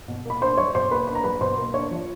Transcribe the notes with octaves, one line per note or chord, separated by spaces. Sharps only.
B2
A#3 B5
D4 C5 C6
F#3 C#5 C#6
B2 C5 C6
A#3 B4 B5
D4 B5
A#5
F#3 B4 B5
B2 C5 C6
A#3
D4 C#5 C#6
F3